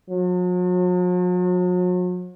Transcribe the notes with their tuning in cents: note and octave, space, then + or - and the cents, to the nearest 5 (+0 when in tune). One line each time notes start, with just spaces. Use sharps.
F#3 -45